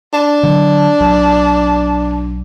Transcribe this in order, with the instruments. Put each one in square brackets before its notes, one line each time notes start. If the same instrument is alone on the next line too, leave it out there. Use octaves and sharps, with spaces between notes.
[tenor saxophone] D4
[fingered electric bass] D3 F#3
B1 F#3